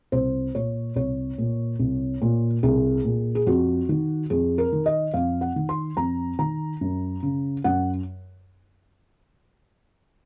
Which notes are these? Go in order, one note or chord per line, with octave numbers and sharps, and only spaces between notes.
C2 C5
A#2 C#5
C2 C#5
A#2
C2
A#2
C2 G#4
A#2
G#4
F2 F#4
D#3
F2 G#4
A#4
D#3
D#5
F2 F5
F#5
D#3
C6
F2 A#5
D#3 A#5
F#2
C#3
F#2 F#5